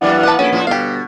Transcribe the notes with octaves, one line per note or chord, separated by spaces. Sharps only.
E3 F#3 A#3 B3 D4
A#3 B4 F#5 A5
A#1 C#4 E4 F#4 A4
A2 F3 E4
G1 B2 G4 F5